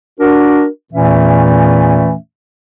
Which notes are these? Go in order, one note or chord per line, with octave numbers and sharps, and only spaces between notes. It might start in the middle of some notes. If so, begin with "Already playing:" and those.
D4 F#4 A#4
E2 A#2 E3 A3 C#4 E5